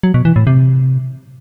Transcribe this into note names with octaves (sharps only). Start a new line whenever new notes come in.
F#3
B2
E3
A2
C3